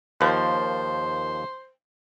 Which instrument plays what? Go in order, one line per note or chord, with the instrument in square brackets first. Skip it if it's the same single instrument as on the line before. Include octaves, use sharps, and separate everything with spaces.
[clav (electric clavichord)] D#2 F3 [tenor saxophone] C5